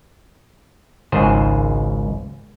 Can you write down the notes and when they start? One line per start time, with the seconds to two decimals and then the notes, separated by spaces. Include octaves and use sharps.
1.12 G#1 C#2 G#2 G#4 C5